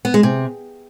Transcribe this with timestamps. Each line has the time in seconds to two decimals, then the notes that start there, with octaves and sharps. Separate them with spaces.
0.05 B3
0.14 G#3
0.23 C3